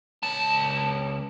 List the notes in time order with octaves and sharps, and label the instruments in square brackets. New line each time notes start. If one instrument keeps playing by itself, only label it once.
[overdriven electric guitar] C#2 A5